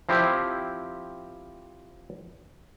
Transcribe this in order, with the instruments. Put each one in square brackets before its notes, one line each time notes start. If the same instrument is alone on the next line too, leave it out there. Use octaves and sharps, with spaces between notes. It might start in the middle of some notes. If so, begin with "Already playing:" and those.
[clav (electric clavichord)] F3 C4 E4 G4